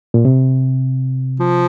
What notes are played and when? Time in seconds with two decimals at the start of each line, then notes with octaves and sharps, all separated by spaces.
0.14 A#2
0.25 C3
1.40 F3